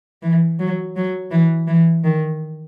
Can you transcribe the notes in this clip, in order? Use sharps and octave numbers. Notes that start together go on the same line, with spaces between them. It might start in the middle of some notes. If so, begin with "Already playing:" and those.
E3
F#3
F#3
E3
E3
D#3